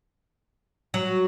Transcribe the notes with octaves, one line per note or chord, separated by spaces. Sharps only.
F#3